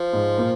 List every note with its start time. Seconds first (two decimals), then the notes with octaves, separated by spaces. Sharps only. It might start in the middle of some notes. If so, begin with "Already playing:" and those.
Already playing: F3
0.13 G#2 G#3
0.38 A#2 A#3